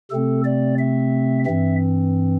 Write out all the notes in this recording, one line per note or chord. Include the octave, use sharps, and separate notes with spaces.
C3 A3 C4 A4
D5
E5
G2 E3 C4 E5